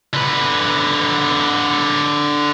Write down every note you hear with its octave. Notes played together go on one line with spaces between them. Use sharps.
D3 B4